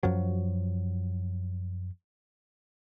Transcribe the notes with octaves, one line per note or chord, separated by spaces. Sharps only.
F#2 F3 F#3